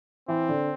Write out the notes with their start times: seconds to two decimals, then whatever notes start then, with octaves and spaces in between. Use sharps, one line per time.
0.28 E3 C4
0.49 D3